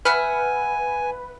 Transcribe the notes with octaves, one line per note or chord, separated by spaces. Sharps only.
B4 E5 F#5 G#5 F6